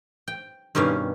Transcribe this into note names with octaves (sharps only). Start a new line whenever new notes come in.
G5
G2 B2 D#3 G3 C#4 F5